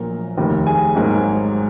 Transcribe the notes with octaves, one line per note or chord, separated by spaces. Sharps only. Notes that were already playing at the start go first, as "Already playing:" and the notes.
Already playing: A#1 A#2 F#3 A#3 A#4 A#5
F1 D#2 D#3 A#3
G#4 G#5
G#1 G#2 F#3 A#3